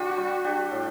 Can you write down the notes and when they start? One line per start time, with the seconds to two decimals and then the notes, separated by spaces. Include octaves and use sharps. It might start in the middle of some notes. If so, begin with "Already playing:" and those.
Already playing: D4 F#4 G4
0.17 G3
0.44 D4 G4
0.71 A2